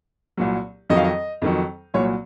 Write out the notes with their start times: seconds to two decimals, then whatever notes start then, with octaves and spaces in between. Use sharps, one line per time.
0.37 C2 A#2 F#3
0.90 F2 D#3 F#3 D#5
0.97 F5
1.04 D#5
1.42 F2 D#3 F#3
1.94 C2 A#2 F#3 C#5